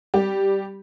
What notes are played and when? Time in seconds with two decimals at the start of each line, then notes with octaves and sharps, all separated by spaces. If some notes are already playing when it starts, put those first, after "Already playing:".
0.14 G3 G4